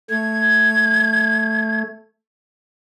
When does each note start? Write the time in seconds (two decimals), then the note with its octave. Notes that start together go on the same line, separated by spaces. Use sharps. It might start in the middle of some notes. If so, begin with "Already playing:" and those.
0.10 A3 G#6